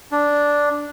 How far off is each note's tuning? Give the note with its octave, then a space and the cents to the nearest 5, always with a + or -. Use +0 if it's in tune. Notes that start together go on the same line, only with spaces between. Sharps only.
D4 -5